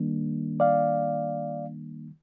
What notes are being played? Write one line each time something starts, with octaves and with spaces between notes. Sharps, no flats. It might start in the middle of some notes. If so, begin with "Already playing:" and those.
Already playing: D#3 G3 A#3 D4
D5 F5